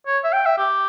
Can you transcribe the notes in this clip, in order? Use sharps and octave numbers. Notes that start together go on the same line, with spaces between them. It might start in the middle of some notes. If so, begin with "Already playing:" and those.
C#5
E5
G5
E5
G4